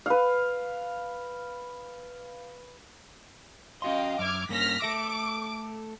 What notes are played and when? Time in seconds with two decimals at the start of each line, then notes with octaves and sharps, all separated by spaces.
0.06 B4 F5
3.82 C#4 F#4 D#5 F5 G5 C6
4.19 F#2 E5 D6 F6 G#6
4.49 G2 A#3 C#4 F6 A#6 B6
4.82 A3 A4 E5 D6 D7